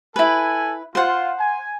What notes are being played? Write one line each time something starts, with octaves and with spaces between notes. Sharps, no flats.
E4 A4 B4 G#5
F4 C5 F#5
G#5